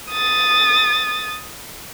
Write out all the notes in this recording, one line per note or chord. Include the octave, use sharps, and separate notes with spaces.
D#6 A6